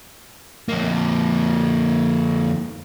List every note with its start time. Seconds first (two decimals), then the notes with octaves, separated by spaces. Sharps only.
0.68 F2 A#3